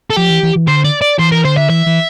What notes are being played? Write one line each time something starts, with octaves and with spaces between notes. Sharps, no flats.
A4
F3 G4
E3
E3
E3
D3 C5
D5
D5
E3 C5
A#4
D3 C5
E5
E3 E5
E3